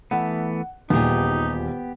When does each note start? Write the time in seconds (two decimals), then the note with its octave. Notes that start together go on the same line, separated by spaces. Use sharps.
0.11 E3 A3 B3 F#5
0.90 D#1 E2 A#2 B3 D#4 G4 G#4